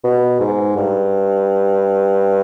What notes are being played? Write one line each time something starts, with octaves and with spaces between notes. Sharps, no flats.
B2
G#2
G2